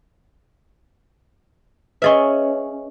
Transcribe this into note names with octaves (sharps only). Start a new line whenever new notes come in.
C#4 G#4 B4 D#5 E5 C#6